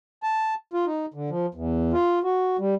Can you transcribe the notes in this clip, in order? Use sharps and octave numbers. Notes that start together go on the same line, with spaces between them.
A5
F4
D#4
D3
F3
E2
F4
F#4
G3